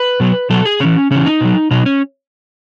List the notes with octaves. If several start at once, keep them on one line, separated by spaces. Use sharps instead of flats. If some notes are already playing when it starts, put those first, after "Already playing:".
Already playing: B4
B2 F#3
B2 F#3 A4
G#4
C#3 E3 C#4
C#3 E3 C#4
D#4
B2 F#3
B2 F#3 D#4
C#4